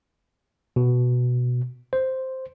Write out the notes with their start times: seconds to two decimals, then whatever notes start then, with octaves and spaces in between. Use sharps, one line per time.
0.76 B2
1.93 C5